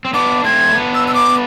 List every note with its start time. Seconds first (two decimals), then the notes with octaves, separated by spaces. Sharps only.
0.05 C4
0.14 B3 D4 D6
0.44 A3 C4 G#6
0.69 E4
0.74 B3 D4
0.95 E6
1.08 E6
1.15 D6